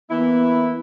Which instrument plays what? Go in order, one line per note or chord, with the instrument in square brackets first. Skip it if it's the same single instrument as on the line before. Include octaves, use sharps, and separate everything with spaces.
[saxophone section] E3 A#3 E4 [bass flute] B3